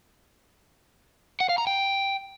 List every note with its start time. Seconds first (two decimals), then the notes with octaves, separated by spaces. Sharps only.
1.40 F#5
1.49 F5
1.58 A#5
1.67 G5